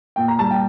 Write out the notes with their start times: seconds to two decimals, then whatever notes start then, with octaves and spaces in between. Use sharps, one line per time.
0.16 A#2 G5
0.28 A#5
0.39 G3 A5
0.51 G5